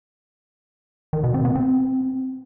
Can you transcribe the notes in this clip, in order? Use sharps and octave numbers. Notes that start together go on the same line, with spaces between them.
D#3
B2
C4
B3
C4